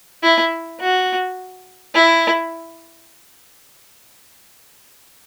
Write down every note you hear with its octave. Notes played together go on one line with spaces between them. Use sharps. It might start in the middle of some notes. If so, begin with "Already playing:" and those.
E4
F#4
E4